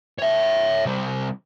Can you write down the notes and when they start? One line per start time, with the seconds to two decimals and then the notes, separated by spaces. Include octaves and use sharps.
0.19 C#5 E5
0.85 C3 G3